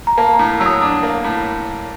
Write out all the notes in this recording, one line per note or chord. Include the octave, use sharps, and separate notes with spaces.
A#5
A#3 A5
A#5
A2
F#3 E6
D#6
D4
A#3
A2